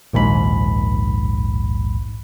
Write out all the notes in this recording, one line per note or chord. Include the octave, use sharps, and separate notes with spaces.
A#1 D#2 G#2 B5